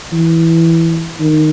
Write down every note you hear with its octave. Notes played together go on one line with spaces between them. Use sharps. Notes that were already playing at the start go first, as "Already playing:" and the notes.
E3
D#3